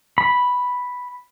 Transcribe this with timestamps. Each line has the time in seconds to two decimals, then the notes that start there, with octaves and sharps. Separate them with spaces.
0.18 B5